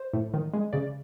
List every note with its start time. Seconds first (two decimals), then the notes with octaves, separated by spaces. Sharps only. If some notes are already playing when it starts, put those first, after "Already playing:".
Already playing: C5
0.13 A2
0.34 D#3
0.54 G#3
0.73 C#3 D5